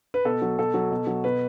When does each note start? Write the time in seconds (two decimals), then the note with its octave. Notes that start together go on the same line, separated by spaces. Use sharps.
0.14 B4
0.25 B2 A4
0.42 F#3
0.58 B2 A4
0.74 F#3
0.91 B2
1.07 F#3
1.24 B2 B4